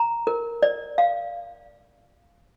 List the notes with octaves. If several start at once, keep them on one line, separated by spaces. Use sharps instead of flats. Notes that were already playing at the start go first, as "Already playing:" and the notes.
Already playing: A#5
A#4
D5
F5